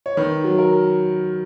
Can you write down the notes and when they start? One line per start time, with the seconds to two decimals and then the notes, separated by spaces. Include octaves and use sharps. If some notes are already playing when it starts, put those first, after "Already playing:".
0.06 C#5
0.17 D#3 B4
0.44 F#3
0.58 A#4